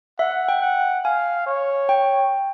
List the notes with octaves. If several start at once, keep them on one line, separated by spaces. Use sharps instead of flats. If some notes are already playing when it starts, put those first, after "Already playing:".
E5 F#5
G5
F#5
F5 G#5
C#5
G5